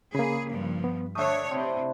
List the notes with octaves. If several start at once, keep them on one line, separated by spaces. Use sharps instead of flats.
C#3 A#3 G#4 B5
G2 F3
B3
D3 A3 D4 C#5 E5 D#6
C3 C4 E4